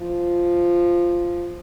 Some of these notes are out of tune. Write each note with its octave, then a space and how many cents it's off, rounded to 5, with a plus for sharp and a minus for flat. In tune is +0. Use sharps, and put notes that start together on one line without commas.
F3 -5